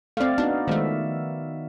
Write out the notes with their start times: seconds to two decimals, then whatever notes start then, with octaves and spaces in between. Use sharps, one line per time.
0.17 A3 C4 D5 F5
0.38 B3 D4 D#4 F#4
0.67 D#3 F3 G#3 A3 E5